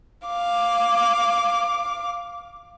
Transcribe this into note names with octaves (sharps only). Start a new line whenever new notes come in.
F5 D6